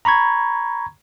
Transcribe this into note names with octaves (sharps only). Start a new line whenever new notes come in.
A#5 B5 C#6 G#6